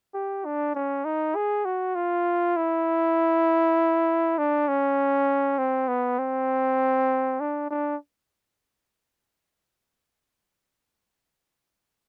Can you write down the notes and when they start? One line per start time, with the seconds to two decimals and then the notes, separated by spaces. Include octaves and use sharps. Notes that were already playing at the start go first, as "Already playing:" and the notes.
0.14 G4
0.45 D4
0.75 C#4
1.05 D#4
1.36 G#4
1.65 F#4
1.95 F4
2.56 E4
4.38 D4
4.68 C#4
5.58 C4
5.88 B3
6.19 C4
7.40 D4
7.71 D4